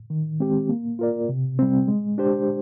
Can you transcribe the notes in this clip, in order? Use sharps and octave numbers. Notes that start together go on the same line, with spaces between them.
D#3
G#3 C4 G4
A#3
F4 A#4 D5
C3
G3 C4
G#3
D4 G4 C5